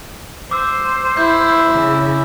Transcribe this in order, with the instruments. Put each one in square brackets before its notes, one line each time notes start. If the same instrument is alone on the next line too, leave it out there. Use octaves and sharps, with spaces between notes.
[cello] C5 [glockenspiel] D6 E6
[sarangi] E4 [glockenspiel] G6
[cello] C#3